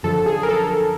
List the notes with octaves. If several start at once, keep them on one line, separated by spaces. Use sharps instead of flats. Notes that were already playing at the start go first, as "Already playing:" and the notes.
F#2 D3 F3 A4
G#4
A#4
A4